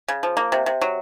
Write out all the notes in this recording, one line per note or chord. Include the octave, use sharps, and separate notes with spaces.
C#3
F3
A#3
C3
C3
F#3